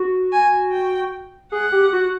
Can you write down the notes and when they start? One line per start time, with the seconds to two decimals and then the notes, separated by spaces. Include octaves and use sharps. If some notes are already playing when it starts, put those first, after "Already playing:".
Already playing: F#4
0.32 G#5
0.72 G5
1.52 G#4 F#5
1.72 G4
1.93 F#4